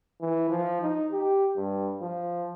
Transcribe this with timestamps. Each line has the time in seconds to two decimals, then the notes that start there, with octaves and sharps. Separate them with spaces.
0.21 E3
0.50 F3
0.82 D#4
1.12 G4
1.57 G2
2.01 F3